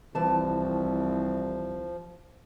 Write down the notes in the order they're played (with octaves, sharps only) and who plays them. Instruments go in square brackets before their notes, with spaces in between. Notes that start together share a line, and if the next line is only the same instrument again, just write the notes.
[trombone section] C2 [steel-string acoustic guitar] E3 A5 [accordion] F3